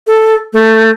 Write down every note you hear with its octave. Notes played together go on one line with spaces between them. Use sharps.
A4
A3